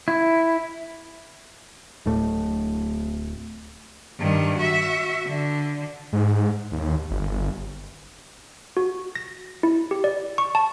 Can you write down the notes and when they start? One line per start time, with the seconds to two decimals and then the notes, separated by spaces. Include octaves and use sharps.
0.08 E4
2.06 D1 A2 A3
4.19 G2 D#3
4.58 F#4 E5
5.26 D3
6.13 G#2
6.72 D#2
7.10 G1
8.77 F#4
9.15 A#6
9.63 E4
9.91 G4
10.04 D5
10.38 C#6
10.55 A5